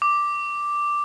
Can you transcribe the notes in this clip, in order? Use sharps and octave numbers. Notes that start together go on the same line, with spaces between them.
D6